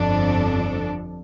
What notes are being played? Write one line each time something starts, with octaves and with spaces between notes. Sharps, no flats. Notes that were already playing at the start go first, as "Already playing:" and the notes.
Already playing: G1 F2 F3 D4 A4